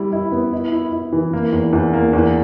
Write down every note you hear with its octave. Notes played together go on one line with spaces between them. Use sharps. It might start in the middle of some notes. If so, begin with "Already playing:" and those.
Already playing: G3 E4
E4
B3
E4
E4
E4
E3
A#3
E2
E2
A#3
E2